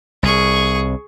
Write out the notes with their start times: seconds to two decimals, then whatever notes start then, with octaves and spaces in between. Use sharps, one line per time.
0.23 C2 G#4 C#6